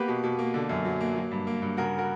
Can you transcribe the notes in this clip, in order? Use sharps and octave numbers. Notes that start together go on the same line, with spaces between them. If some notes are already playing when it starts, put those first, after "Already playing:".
Already playing: A#3 B3 G4 B4
B2
B2
A#3
D3
F#2
F#3
A#3
F#3
G2
A#3
G2
C#3 F#4 A#4
F#4 A#4